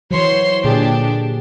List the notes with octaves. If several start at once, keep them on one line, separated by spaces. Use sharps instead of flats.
E3 F#3 C5 C#5 C6
A#2 D3 D4 G4 G#4